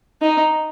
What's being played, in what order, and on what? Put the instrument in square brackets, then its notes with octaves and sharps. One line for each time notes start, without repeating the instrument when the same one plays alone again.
[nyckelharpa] D#4